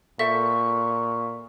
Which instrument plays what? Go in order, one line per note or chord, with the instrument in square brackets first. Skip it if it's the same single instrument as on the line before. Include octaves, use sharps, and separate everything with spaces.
[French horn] A#2 [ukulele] A4 C5 E5 [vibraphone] C#6